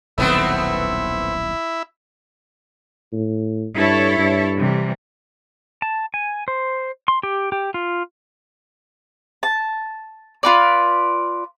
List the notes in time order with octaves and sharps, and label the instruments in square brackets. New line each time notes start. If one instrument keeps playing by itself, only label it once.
[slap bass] D#1 B1 D#3 [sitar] A3 B3 C4 [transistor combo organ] E4 E5
[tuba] A2
[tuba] G2 [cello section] E4 A4 C#5
[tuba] G2
[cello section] C3 E3 G3
[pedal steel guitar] A5
G#5
C5
C6
G4
G4
F4
[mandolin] A5
F4 B4 D5